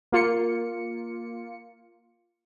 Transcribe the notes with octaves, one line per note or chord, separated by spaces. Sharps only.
A#3 F4 C#7